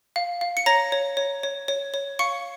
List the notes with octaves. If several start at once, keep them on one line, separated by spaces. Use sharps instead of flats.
F5
F5
C#7
C#5 A#5 A#6
C#5
C#5
C#5
C#5
C#5
F5 C#6 C#7